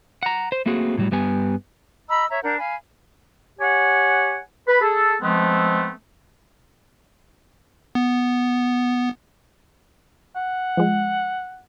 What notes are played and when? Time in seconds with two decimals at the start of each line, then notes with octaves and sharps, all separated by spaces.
0.23 F#5 A#5
0.52 C5
0.66 A3 A#3 C4 F#4 G#4
0.97 A2 C#3 F#3 G3
1.11 G2 G3 B3 G#5
2.09 D#5 A#5 B5 E6
2.29 C#5 E5 A#5
2.43 D4 A#4 F#5 G6
2.58 F5 G#5 B5
3.60 G4 C#5 F#5 G#5
4.67 B4 B5
4.81 G#4 A4
5.21 F3 G#3 A3 B3 C4
7.95 B3
10.36 F#5
10.77 F3 G#3